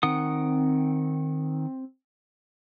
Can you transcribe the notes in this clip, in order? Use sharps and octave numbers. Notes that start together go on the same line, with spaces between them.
D#3 C4 F#5 D#6